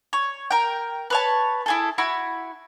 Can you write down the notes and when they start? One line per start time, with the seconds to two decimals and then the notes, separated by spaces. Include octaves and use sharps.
0.13 C#5
0.50 A#4 G5
1.10 B4 C#5 A5
1.66 E4 G#4 A4
1.98 E4 F#4 B5